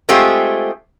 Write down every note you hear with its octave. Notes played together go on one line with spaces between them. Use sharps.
G#3 A3 C4 F4 G4 G#4